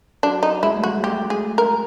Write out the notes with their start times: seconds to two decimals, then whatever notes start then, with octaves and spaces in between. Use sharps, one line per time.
0.23 F#3 D4
0.43 D#4
0.63 G#3 E4
0.75 A3
0.84 F#4
0.86 G#3
0.97 G#3
1.03 A3 G4
1.30 G#4
1.58 A#4